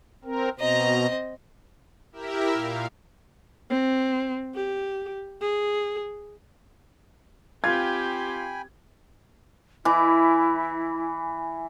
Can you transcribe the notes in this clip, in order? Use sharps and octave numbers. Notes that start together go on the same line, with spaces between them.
C4 A#4
B2 C4 D#5 A#5
E4 G4 A#4 E5
A#2 F5
C4
G4
G#4
C4 F4 G4 G5 G#5 B5 G#6
E3 E4